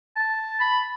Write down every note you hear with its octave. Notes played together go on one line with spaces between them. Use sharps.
A5
B5